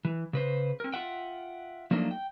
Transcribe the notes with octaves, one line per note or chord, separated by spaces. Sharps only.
E3
C#3 B4 C5
C4 A#4
F4 E5 F#5 G5
F3 F#3 A3 A#3 D4 D#4
G5